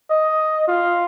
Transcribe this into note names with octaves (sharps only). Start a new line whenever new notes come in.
D#5
F4